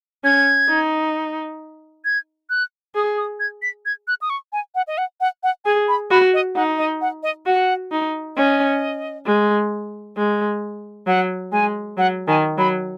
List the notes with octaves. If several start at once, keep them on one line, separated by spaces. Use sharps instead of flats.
C#4 G#6
D#4
G#6
F#6
G#4 D#6
D#6
G#6
B6
G#6
F#6
D#6
C#6
G#5
F#5
D#5
F#5
F#5
F#5
G#4 G#5
B5
F#4 B5
D#5
D#4 F#5
D#5
F#5
D#5
F#4 F#5
D#4
C#4 D#5
G#3
G#3
F#3 F#5
G#3 G#5
F#3 F#5
D#3 G#5
F#3 B5